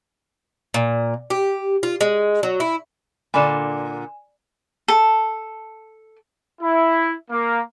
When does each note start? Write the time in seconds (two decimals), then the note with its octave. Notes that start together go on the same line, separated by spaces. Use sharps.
0.74 A#2
1.30 G4
1.83 F4
2.01 G#3
2.43 F#3
2.60 E4
3.34 A#2 D3 D5 G#5 B5 E7
4.88 A4
6.61 E4
7.31 A#3